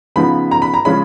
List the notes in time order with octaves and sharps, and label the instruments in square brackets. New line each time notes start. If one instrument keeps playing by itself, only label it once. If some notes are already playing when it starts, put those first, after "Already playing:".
[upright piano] C#3 F3 B3 D#4 B5
A#5
B5
A#5
C#3 F3 G#3 C#4 B5